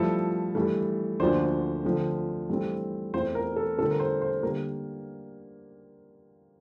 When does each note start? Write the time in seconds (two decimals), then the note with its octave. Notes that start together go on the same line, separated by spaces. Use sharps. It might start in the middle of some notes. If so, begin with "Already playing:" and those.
Already playing: G2 F3 A3 E4 A4
0.55 G2 E3 A3
1.20 D2 D3 F3 A#3 D4 C5
1.84 D3 F3 A3 C4
2.50 G2 E3 A3 C4
3.14 E2 E3 A3 C4 E4 C5
3.35 A#4
3.56 A4
3.78 G2 D3 A3 C4 A4
3.91 A#4
4.00 C5
4.21 C5
4.43 D3 G3 A#3 A#4